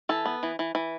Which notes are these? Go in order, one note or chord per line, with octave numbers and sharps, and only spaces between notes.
E3 A4
B3
E3
E3
E3